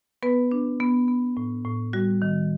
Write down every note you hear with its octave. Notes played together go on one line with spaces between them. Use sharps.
B3 B4
D4
B3
B3
A2
A2
G3 F#4
D#3